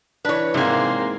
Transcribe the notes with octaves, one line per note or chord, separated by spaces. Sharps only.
E3 D4 B4 C#5
G#2 C3 A#3 C4 G#4 E5